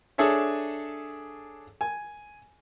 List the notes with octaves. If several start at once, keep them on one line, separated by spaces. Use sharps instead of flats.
D4 G#4 A4 C#5 E5
G#5